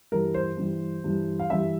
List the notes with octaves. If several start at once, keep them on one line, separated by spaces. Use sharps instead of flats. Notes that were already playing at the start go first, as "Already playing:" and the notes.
G2 E3 G3 A#4
C5
G2 E3 G3
G2 E3 G3
F5
G2 E3 G3 E5